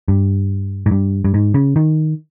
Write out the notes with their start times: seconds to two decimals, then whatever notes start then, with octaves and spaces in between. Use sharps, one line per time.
0.08 G2
0.86 G#2
0.91 G2
1.25 G2
1.34 G#2
1.54 C#3
1.76 D#3